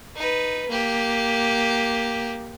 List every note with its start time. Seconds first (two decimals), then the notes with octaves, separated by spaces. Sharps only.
0.16 D#4 B4
0.69 A#3 G4